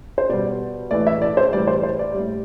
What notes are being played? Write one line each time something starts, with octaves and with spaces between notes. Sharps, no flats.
C5
B2 G3 D5
A2 E3 A3 D5
E4 E5
D5
C5
A2 E3 G3 D5
C5
C5
D5
A2 G3